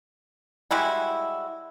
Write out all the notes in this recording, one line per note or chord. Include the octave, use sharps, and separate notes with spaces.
G3 G#3 E4 F#4